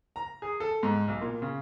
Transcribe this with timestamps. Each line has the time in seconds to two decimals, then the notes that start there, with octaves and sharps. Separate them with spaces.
0.16 A#5
0.42 G#4
0.60 A4
0.83 G#2
1.08 B1
1.21 A#2
1.42 C#3